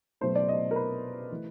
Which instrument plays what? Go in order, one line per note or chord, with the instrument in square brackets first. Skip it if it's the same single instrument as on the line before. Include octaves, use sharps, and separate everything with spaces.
[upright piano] B2 F#3 A3 C5
D5
D#5
A#4
B4
E3 A3